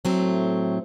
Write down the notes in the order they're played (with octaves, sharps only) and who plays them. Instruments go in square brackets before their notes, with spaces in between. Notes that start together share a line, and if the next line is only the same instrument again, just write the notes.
[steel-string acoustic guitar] A2 F#3 A3 C4